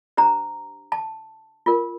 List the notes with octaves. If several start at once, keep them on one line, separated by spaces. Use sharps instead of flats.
D4 G4 C5 A#5
A5
F4 A#4